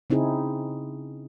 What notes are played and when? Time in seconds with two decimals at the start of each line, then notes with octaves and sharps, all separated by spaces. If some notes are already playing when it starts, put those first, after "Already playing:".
0.10 C#3 C4 D#4 E4 G#4